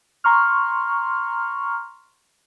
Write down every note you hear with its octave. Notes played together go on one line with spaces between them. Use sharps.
A#5 C6 C#6 F6